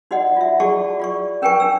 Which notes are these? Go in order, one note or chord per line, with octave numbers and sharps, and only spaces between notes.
D#4 F#4 D5 D#5 F#5
F4 E5
E4 F#4 G#4 D5 A5 C#6
F4 D5 C#6
C#4 A#4 B4 G5 G#5 C#6
D4 E6